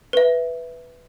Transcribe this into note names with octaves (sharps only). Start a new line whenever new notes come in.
B4 E5